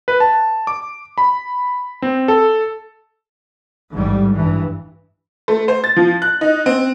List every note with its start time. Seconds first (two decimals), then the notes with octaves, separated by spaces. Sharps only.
0.08 B4
0.20 A5
0.67 D6
1.18 B5
2.02 C4
2.28 A4
3.94 A1 G#2 G3
4.34 G2 E3
5.48 A3
5.68 C5
5.84 A6
5.96 F3
6.22 F#6
6.41 D#4
6.66 C4